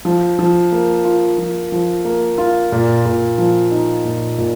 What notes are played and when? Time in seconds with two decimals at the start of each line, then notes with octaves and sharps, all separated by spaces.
0.05 F3
0.39 F3
0.72 A#3
1.04 F4
1.38 F3
1.72 F3
2.05 A#3
2.38 F4
2.72 A#2
3.05 A#2
3.38 F3
3.71 D#4
4.05 A#2
4.38 A#2